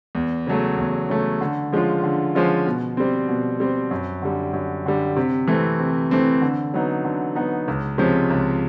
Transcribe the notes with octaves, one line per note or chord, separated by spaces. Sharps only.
E2
C#3 F#3 A3
E2
C#3 F#3 A3
D3
F3 G#3 C#4 F4
D3
F3 G#3 C#4 F4
B2
G3 C4
B2
G3 C4
F#2
D3 G3
F#2
D3 G3
C3
E3 A3 C4
C3
E3 A3 C4
D3
F#3 B3 D#4
D3
F#3 B3 D#4
C#2
C3 F3 G#3 C#4
C#2